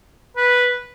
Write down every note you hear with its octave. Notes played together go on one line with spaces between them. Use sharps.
B4